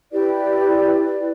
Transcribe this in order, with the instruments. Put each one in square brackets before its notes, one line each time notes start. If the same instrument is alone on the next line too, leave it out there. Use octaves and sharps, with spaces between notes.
[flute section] E4 G4 B4 D5